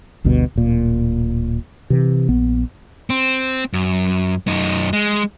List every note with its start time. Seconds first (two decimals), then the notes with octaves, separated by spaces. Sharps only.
0.24 G1 D2 G2 B2
0.56 D1 A#2
1.90 C3 E3
2.29 A#1 B3
3.10 C4
3.73 F#2
4.48 F#2 D#4
4.93 G#3